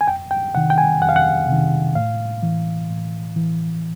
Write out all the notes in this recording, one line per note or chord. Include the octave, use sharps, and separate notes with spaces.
G#5
F2 G5
G5
C3 D#3 F#5
G5
G#5
F2 F#5
F5
F#5
C3 D#3
A2 F5
E3
A2
E3